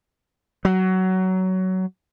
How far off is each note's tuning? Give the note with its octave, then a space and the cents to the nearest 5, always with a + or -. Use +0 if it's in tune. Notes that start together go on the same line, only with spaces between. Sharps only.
F#3 +15